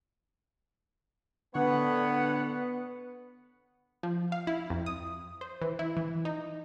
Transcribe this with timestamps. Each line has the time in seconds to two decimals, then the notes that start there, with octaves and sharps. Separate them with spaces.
1.55 A2 D3 B3 C#5 F#5
4.03 F3
4.32 F5
4.47 E4
4.70 F2
4.86 D#6
5.41 C5
5.62 E3
5.79 E4
5.97 E3
6.25 D#4